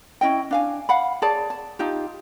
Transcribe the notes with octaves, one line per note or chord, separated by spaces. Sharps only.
C#4 E4 D#5 G5
D4 F5 G#5
F5 F#5 B5
G#4 C#5 D5 A5
A5
D#4 F4 G4